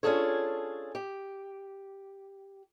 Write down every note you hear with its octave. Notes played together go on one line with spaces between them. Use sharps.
C#4 D4 F4 G#4 A4 C#5
G4